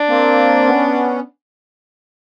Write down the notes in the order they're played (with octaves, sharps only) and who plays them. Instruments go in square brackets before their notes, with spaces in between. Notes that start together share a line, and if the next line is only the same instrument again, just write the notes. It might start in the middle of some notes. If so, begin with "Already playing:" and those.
Already playing: [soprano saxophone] D4
[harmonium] A#3 C4
B3 C#4